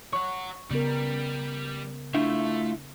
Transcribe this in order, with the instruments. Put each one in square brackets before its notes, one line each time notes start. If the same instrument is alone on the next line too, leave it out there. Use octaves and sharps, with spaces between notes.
[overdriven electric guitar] C#5 F#5 [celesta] C#6
[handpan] C#3 B3 A#4 [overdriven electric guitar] G3
[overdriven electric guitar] A3 [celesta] D4 [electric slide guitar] E4 F4 E5